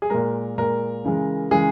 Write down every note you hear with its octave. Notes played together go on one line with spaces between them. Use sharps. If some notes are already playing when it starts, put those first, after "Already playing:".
G#4
A#2 G#3 A#4
A#2 G#3 A#4
C#3 E3 G#3
C#3 E3 G#3 G#4